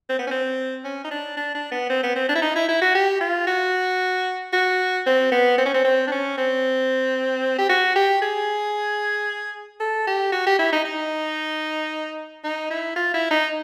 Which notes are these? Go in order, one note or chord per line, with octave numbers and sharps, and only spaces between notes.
C4
B3
C#4
C4
C#4
D#4
D4
D4
D4
B3
C4
B3
C4
D4
E4
D#4
E4
E4
F#4
G4
F4
F#4
F#4
C4
B3
C4
C#4
C4
C4
D4
C#4
C4
G4
F#4
G4
G#4
A4
G4
F#4
G4
E4
D#4
D#4
D#4
E4
F4
E4
D#4